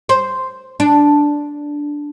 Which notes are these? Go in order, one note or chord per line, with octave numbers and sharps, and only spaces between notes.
C5
D4